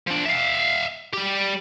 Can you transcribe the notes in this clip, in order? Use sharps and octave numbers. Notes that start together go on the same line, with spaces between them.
F3 D4
E5 F5
G3 G4